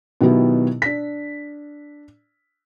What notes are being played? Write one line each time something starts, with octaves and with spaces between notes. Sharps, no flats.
B2 D#3 F#3 B3 E4 G4
D4 B6